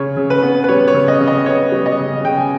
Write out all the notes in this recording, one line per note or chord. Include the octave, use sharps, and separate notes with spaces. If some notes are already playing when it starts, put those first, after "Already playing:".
Already playing: C#3 C#5
C#3
B4
B3
B4
G3 C#5
C#5
C#3
D#5
C#3
D#5
B3 C#5
G3
D#5
C#3
C#3 G5
G#5